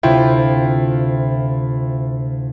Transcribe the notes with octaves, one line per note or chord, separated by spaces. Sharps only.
D2 C3 E4 F4 G5